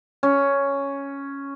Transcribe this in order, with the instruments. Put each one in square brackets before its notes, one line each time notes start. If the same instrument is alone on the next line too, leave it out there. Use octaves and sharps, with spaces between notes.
[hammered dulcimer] C#4